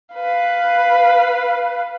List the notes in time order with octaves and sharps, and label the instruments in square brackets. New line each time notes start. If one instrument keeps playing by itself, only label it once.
[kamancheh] B4 F5